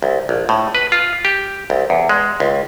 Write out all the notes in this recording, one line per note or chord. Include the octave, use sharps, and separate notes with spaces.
C2
A#1
A2
B4
F4
G4
C2
E2
G#3
C#2